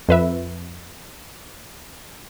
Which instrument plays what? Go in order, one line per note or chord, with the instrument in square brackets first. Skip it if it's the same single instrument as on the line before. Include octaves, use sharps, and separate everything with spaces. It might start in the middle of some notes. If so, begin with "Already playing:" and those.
[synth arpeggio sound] F2 B4 E5